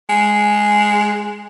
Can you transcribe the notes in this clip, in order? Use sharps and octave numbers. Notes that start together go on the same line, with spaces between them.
G#3